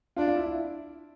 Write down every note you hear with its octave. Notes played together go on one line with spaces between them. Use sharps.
D4 F4
F4
E4
E4